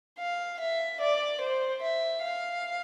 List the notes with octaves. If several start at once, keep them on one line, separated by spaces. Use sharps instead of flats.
F5
E5
D5
C5
E5
F5